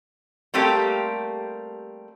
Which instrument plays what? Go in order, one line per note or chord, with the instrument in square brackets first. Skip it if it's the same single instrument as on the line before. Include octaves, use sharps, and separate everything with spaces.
[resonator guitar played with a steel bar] G3 A3 A#3 C4 G4